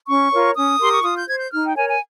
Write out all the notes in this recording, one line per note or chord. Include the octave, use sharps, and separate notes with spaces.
C#4 C#6
F4 A#4 C#5
C#4 D#6
G4 A#4 C6
C#6
F4 D#6
G6
C5 G#6
G6
D#4 F6
G5
A#4 C#5 G#5
G#5